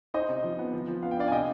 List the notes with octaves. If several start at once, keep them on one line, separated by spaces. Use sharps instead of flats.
D#4 C5 D#5
C3
F3
B3
F3
F3
B3 F5
G5
D4 D5 F5
G#5
C3 D#5 G5